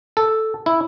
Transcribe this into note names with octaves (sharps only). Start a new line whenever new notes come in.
A4
E4